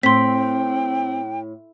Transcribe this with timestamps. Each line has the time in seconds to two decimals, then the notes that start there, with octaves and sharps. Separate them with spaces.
0.03 A2 C4 G5 C6 B6